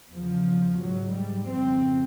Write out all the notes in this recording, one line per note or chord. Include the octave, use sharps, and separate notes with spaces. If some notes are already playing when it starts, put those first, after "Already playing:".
E2 C#3 F3
G#2 F#3
G3
F2 C#3 C4